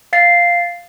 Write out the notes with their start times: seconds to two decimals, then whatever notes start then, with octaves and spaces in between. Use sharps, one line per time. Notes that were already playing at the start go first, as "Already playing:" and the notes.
0.13 F5 A6 C7